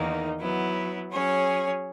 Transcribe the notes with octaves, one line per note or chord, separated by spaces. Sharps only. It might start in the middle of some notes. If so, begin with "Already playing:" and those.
Already playing: E2 D#3 A#3 D#4
F#3 B3 E4
F#3 C#4 G#4 C#5